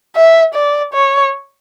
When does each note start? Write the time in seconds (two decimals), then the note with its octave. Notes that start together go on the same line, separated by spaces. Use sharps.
0.16 E5
0.55 D5
0.94 C#5